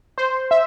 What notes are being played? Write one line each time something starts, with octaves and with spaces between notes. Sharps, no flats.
C5
E5